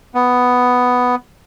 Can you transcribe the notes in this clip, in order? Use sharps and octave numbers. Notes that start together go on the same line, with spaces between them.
B3